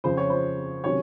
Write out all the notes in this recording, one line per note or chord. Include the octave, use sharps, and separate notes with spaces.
F2 C#3 F3 C5
C#5
C5
C3 D#3 F#3 C#4 C#5